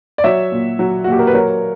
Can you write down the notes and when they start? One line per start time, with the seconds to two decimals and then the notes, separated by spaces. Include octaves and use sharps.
0.18 D5
0.24 F#3 C#5 E5
0.52 A#2
0.79 F#3
1.04 F#4
1.07 A#2 G4
1.19 A#4
1.27 B4
1.34 F#3 A#4 C#5